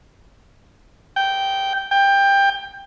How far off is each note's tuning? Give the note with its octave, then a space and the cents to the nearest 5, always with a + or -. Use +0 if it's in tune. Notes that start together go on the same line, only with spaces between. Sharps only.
G5 -10
G5 +15